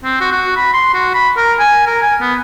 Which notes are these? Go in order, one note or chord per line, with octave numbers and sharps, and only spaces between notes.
C4
F#4
F#4
B5
C6
F#4
B5
A#4
G#5
A#4
G#5
B3